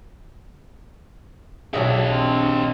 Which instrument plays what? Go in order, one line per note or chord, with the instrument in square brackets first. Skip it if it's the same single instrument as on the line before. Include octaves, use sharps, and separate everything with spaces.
[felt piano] B1 G#4 [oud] D4 C#5 E5 [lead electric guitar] G4 D#5
[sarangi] C4